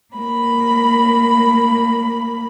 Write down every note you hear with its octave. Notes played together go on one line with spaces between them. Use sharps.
A#3 B5